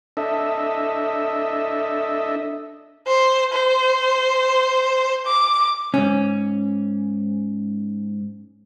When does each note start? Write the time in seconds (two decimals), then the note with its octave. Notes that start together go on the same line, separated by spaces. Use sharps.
0.17 D4 A4 D#5 E5
3.07 C5
3.52 C5
5.26 D6
5.94 D2 G#2 C#4